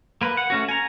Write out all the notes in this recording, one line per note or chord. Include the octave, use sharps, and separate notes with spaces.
A#3 B4
F#5
A3 C#4 F#4
G#5 A#5